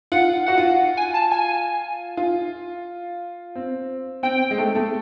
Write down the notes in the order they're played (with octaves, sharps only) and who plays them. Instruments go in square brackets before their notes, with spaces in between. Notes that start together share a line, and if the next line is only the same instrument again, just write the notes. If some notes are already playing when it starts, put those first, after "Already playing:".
[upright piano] F4 [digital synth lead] F#5
[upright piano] F#4 [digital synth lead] F#5
[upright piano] F4
[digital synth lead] G#5
A5
G#5
[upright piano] F4
C4
[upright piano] C4 [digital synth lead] G5
[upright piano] G#3
A3
A3